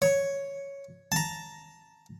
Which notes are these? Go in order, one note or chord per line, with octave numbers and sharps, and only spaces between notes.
C#5
A5 A#5